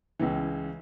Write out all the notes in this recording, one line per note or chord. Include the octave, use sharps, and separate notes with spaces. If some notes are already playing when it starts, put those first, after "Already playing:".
C#2 C#3 E3